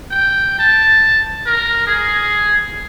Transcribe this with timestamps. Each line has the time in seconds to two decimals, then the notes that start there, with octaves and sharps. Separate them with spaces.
0.11 G5
0.59 A5
1.46 A#4
1.87 G#4